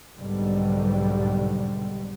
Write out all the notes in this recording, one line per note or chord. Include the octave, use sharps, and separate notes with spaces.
B1 G#2 B2 D3 G3